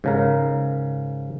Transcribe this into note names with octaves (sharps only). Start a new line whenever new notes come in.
G#2 C#3 A#4